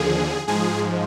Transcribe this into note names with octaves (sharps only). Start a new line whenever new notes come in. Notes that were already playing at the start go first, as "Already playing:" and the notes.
Already playing: D#2 D3 F3 G#4
G#2 F3 G#3 G#4